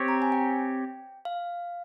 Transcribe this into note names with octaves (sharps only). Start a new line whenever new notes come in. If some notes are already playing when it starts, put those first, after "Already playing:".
Already playing: C4 G4 C#5
A#5
G#5
G5
F5